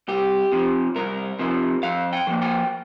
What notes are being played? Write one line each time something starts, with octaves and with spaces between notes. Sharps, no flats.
C2 G4
C3 F3
C2 A#4
C3 F3
F2 F5
G5
F3 A#3
G5